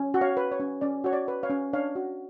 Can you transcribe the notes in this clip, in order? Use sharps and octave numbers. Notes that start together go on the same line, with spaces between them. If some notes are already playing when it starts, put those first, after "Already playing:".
Already playing: C#4
F#4
C#5 F5
B4
C#5
C#4
C#4 D5
F#4 C#5
D5
B4
C#5 F5
C#4
D4 C#5 F5
F#4